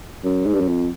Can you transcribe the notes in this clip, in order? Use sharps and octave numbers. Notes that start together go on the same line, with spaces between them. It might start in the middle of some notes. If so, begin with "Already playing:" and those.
F#2
G#2
G2
F#2
F2